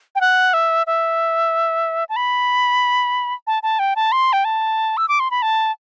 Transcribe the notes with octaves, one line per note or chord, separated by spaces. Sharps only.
G5
F#5
E5
E5
A5
B5
A5
A5
G5
A5
C6
G5
A5
E6
D6
C6
B5
A5